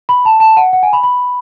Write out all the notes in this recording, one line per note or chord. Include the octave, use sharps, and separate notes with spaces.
B5
A5
A5
F#5
F#5
G#5
B5
B5